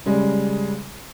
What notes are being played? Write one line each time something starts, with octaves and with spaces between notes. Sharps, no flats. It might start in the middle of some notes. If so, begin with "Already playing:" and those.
C#3 G3 G#3